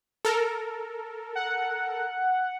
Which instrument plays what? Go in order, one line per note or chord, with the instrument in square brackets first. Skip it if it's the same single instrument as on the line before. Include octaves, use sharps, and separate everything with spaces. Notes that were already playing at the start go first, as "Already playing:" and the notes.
[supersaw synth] A4 A#4
[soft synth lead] F#5